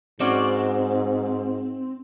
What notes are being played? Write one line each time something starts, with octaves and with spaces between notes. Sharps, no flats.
G#2 C4 C#4 F#4 D5